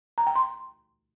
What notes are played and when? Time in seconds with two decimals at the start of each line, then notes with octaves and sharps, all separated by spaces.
0.18 A#5
0.27 G5
0.36 C6